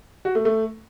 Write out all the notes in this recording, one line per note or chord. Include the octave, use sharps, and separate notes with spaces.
F#4
A3
A3